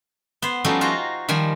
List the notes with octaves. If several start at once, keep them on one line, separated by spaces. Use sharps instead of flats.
B3 C5
F3 G3 A3 C#4 D#4 F#4
F4 F#4 C5 A#5
D#3 F3 G3 G#5